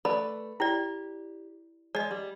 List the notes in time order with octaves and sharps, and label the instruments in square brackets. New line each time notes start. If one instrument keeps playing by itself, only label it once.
[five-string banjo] A3 B4 D5 [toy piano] B5
[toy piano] E4 D5 [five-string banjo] G4
[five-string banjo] G#3 [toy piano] D5 D#5
[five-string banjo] G3